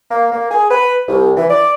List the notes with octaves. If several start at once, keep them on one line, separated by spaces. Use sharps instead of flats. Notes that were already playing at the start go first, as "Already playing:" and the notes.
A#3
A#3
G#4
B4
C2
E3
D5